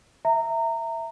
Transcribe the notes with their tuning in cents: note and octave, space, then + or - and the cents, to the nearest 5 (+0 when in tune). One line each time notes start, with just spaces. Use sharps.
E5 +0 A#5 -25